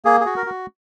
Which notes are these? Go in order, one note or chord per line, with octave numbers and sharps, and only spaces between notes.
A#3 G#4
G#4
F#4
A#4
F#4